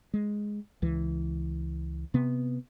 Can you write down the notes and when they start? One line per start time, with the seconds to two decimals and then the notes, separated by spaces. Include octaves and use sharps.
0.14 G#3
0.82 C#2 E3
2.14 C3 B3